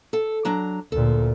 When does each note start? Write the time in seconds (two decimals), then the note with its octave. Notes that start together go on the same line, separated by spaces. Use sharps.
0.13 A4
0.45 F#3 D4 A#5
0.92 D2 A#2 A4